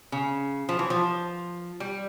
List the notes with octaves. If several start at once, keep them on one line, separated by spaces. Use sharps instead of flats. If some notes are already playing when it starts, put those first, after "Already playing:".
C#3
F3
E3
F3
G3